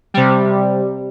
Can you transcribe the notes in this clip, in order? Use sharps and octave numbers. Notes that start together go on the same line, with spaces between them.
C3 G3